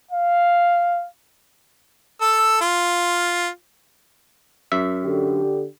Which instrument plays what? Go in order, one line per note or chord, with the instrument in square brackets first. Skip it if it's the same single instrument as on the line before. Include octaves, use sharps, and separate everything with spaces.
[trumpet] F5
[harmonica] A4 E6
F4
[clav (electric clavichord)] F#2 E5
[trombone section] D3 G4